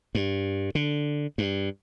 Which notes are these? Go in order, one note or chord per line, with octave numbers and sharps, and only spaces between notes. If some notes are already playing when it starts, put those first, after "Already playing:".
G2
D3
G2